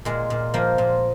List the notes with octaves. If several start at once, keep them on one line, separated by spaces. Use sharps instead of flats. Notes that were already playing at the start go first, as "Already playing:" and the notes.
A#2 G#3
A#2
F3 A#3
A#2